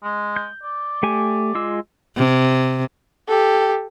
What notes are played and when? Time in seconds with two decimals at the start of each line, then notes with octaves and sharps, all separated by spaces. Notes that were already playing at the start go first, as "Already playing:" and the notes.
0.04 G#3
0.36 G6
0.63 D5
1.03 A3 G4 G#5
1.55 G#3 F4 E6
2.17 C3
3.28 G4 A4